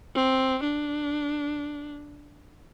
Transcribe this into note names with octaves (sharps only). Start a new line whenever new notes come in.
C4
D4